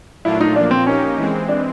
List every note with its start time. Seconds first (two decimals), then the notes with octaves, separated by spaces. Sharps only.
0.25 A#2 F#3 A3 D4 E4 F4
0.41 D#4
0.56 A#2 F3 A#3 D4
0.71 C4
0.87 A#3 C#4 D#4 G4
1.17 E3 G#3 C4
1.49 D4